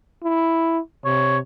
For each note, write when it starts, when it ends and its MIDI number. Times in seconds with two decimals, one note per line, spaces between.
0.23 0.79 64
1.05 1.40 48
1.05 1.38 73